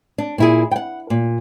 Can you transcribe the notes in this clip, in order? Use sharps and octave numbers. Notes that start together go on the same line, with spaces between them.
D4
A#2 E4 G#4
F#5 G5
A#2